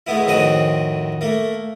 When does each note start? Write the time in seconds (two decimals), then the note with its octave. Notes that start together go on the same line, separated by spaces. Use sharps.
0.07 G#3 A3 B3 E4
0.26 F2 A2 D#3 C4 F#4 D#5
1.21 A3 A#3